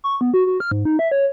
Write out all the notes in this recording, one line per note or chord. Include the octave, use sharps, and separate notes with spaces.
C#6
B3
F#4
F#4
F6
G#2
D#4
E5
C#5